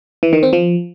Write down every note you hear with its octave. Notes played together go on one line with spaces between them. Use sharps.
E3
D#3
C4
F3